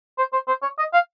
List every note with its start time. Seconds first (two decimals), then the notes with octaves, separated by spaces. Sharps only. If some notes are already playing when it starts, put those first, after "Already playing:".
0.18 C5
0.33 C5
0.48 C5
0.62 C#5
0.78 D#5
0.94 F5